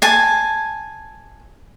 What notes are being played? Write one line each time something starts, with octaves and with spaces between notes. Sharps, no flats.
G#5 A5